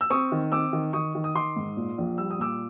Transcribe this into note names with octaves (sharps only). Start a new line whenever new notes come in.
E6
C4 C#6 D#6
D#3
C4 D6 E6
D#3
D#3 C#6 D#6
D#3
D#6
D#3 C6 D6
G#2
A#2
A#1
G3 E6
D#6
A#2 D6 E6